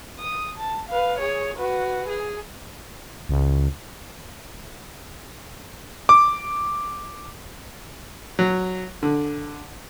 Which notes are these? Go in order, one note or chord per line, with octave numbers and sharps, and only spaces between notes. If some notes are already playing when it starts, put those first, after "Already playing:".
D#6
A5
B4 F5
G#4 C#5
F#4 B4
G#4
C#2
D6
F#3
D3